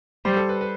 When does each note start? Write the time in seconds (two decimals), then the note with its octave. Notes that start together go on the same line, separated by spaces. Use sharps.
0.25 G3 C5
0.37 A4
0.49 B4
0.61 B4